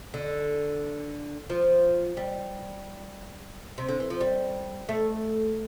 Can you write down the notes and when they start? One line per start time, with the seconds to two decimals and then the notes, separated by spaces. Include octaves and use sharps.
0.14 D3
1.50 F3
2.17 G3
3.78 C3
3.89 D3
4.00 E3
4.10 F3
4.21 G3
4.89 A3